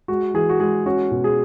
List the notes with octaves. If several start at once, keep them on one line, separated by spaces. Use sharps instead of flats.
G#3 F#4
E3 G#4
F#4
G#3 G#4
C#4 F#4
B2
G#4